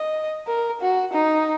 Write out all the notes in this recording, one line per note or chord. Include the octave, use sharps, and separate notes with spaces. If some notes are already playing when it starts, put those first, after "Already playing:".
Already playing: D#5
A#4
F#4
D#4